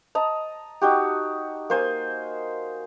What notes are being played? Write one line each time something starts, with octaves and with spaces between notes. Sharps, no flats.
D#5 A5 A#5
D#4 F#4 G4
A#3 C5 G#5